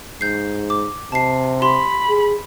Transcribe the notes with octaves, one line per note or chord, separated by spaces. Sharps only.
G#2 G6 C7
D6
C3 A5 C7
G4 B5 C6
G#4